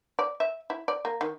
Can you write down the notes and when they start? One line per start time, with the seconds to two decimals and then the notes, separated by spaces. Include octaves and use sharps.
0.19 D5
0.40 E5
0.70 E4
0.88 D5
1.05 A#3
1.21 D#3